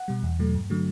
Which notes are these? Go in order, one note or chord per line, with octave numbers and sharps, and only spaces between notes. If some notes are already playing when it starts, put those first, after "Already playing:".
Already playing: F#5
B2 G3
E2
B2 F#3 A3
G2
D3 F#3 A3